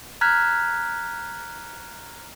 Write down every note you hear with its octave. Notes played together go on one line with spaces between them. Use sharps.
A#5 F6 F#6 G#6 B6